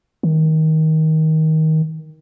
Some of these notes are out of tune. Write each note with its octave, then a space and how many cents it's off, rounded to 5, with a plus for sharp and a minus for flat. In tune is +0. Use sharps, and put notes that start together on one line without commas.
D#3 +20